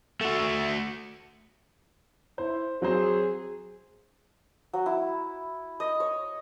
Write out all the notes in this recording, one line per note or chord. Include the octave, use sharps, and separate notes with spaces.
A3 F#4
E4 C5
F#3 C4 G#4 C5
F#3
E4
D#5
C#5